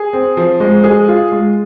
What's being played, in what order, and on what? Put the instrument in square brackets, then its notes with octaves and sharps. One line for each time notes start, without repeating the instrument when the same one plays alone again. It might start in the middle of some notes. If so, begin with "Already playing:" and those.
Already playing: [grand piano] G#4
C4
F3
G#3
G#4
F4
G#3